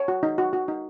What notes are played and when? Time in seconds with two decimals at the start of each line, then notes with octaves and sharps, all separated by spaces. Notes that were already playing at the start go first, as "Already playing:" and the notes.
Already playing: C#5
0.08 F#4
0.23 D#4
0.38 F#4
0.53 F#4
0.68 D#4